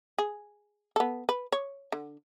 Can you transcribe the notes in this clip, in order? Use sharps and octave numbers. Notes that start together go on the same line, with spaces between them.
G#4
B3 A4
B4
C#5
D3